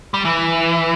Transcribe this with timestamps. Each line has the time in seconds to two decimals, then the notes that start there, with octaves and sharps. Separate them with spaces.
0.14 G3
0.25 E3